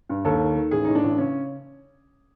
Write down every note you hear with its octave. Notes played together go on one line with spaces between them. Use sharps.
G2
D#2 A4
D#3
D#3
A1 G#4
A2 D#4
D4
A1
C#3 C#4